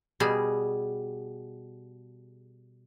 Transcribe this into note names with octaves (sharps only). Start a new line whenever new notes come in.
B2 G3 G#4